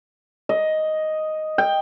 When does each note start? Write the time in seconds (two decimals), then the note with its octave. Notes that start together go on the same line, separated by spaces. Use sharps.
0.49 D#5
1.58 G5